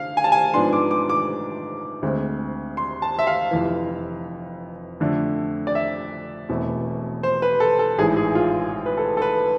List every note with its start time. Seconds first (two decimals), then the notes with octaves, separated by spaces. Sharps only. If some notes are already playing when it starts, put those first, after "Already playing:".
Already playing: D3 F5
0.17 G#5
0.24 A5
0.32 G#5
0.54 G#2 F3 B3 D4 C6
0.73 D6
0.91 D6
1.09 D6
2.02 D2 D3 G#3 C4
2.77 C6
3.02 A5
3.19 E5
3.27 F5
3.51 F1 F2 E3
5.00 F2 D3 A3 D4
5.67 D5
5.75 E5
6.49 E1 E2 B2 A3 C4
7.23 C5
7.42 B4
7.60 A4
7.79 A4
7.98 A1 G#2 E3 G#4
8.17 G#4
8.35 F4
8.86 B4
8.97 A4
9.17 A4
9.22 B4